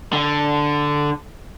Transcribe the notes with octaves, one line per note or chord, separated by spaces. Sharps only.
D3